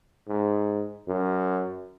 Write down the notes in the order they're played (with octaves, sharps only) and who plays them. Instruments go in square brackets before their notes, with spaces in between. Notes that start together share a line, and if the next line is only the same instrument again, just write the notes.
[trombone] G#2
F#2